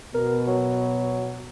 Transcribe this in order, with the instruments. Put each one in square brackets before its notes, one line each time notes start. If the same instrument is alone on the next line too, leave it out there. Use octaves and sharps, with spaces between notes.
[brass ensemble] B2 [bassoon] A#4
[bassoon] F#3